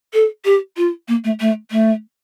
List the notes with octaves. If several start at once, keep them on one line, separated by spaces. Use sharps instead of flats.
A4
G4
F4
A#3
A3
A3
A3